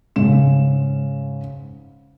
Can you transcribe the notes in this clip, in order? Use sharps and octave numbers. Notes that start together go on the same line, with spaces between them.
G#2 C#3 E7